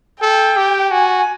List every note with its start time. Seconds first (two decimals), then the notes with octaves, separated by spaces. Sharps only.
0.21 A4 G5
0.56 G4
0.91 F#4 G#5